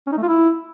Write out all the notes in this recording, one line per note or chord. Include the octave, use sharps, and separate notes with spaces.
C#4
D#4
A3
F4
E4